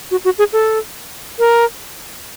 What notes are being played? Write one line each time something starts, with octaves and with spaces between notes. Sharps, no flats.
F#4
F#4
G#4
A4
A#4